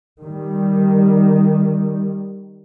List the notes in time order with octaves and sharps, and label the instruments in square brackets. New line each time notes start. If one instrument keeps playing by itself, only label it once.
[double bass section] D#3 G3